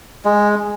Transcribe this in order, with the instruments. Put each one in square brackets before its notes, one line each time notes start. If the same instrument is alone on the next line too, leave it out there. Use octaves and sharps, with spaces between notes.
[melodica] G#3